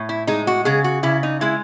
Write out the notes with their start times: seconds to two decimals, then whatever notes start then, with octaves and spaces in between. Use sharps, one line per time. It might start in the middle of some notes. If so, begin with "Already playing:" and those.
Already playing: A2
0.09 E4
0.27 G#3 D#4
0.47 F#4
0.65 C#3 G#4
0.84 F#4
1.03 C#3 E4
1.23 D#4
1.41 G#3 E4